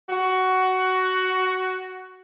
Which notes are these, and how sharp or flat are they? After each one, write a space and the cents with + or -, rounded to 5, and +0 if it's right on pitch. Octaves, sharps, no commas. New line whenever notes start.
F#4 +10